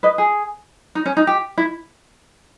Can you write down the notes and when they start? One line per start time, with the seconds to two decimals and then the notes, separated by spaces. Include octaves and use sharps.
0.03 B4 D#5
0.18 G#4
0.95 D#4
1.06 C#4
1.17 D#4
1.27 G4
1.58 E4